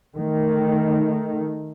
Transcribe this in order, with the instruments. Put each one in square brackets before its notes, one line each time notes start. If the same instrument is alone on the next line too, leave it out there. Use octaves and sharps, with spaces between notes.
[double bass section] D#3 A3